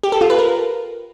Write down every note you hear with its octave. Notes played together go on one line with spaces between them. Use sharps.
G4
A4
F4
B4
A#4